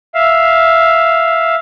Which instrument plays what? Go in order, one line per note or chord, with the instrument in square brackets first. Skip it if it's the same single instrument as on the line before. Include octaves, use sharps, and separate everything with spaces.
[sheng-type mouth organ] E5 F5